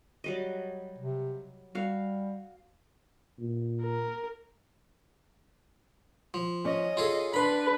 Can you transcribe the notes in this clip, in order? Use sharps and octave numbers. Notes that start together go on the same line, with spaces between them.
F#3 G3 D#5
C3
G3 F#4 F5
A#2
A#4
F3
C#4 D#5
F4 G#4 A4
D4 B4 B5 C6